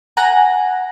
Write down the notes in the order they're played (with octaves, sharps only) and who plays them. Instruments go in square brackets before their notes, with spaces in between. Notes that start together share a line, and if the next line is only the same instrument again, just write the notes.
[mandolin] F#5 G#5 A#5